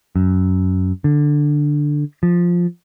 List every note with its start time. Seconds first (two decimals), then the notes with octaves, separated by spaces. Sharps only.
0.16 F#2
1.04 D3
2.23 F3